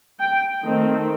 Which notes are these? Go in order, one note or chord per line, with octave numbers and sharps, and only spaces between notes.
G5
D#3 A3 C4 D#4